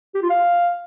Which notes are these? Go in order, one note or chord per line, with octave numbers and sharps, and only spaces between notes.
G4
F4
F5